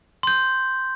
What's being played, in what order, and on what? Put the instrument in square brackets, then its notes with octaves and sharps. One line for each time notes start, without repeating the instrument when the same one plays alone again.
[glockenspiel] C6 G6